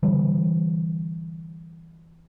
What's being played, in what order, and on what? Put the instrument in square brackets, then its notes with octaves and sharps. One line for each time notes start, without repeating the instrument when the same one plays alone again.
[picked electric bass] D3 E3 G3